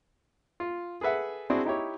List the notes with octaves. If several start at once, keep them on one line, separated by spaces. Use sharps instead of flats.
F4
G#4 A4 B4 E5 F#5
C4 D4 E4 F#4 G#4
D#4 E4 G4 C#5